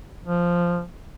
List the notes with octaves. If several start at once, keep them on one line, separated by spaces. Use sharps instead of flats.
F3